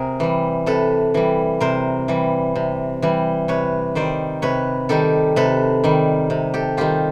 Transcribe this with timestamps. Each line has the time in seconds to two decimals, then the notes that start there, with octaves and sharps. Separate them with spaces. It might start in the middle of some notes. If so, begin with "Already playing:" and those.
Already playing: C3 G#4 A#4
0.20 E3 G3
0.66 C3 A4 B4
1.14 E3 G3
1.60 C3 A#4 C5
2.08 E3 G3
2.56 C3
3.02 E3 G3
3.48 C3 B4 C#5
3.95 D#3 G3 C5 D5
4.42 C3 B4 C#5
4.89 D#3 G3 G4 A4
5.36 C3 A4 B4
5.84 D#3 G3
6.30 C3
6.54 G4 A4
6.77 D#3 G3 F4 G4